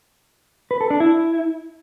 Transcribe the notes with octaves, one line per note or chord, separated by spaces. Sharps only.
B4
A4
D4
E4